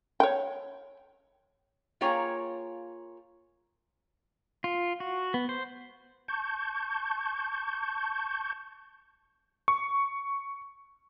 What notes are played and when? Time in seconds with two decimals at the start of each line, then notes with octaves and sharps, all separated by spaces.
0.20 C#5 G5
2.01 A#3 F4 G#4 C#5 G5 A#5
4.64 F4
5.00 F#4
5.34 B3
5.49 C5
6.28 A5 C#6 G6
9.68 C#6